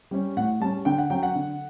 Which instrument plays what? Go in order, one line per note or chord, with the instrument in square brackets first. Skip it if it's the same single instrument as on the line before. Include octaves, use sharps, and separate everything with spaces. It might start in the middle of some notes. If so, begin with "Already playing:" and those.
[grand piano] G3 C#4
A2 F#5
G3 C#4 A5
D3 G5
F#5
F#3 C#4 G5
F#5
D3